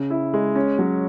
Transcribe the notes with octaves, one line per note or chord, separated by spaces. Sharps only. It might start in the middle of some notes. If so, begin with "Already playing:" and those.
Already playing: C#3
E4
G#3
C#4
F#3